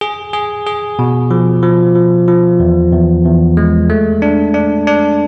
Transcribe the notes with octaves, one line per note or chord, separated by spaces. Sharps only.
G#4
G#4
G#4
B2
F3
F3
F3
F3
E2
E2
E2
G#3
A3
D4
D4
D4